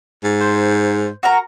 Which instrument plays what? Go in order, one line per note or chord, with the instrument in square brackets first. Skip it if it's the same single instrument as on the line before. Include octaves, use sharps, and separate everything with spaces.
[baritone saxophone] G#2
[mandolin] C5
F#4 A#4 A#5